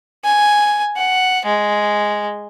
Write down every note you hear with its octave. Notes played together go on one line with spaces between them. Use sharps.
G#5
F#5
G#3